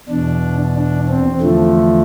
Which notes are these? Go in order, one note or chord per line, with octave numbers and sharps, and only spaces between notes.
E2 B2 D4
D4
C4
E2 D3 F3 A3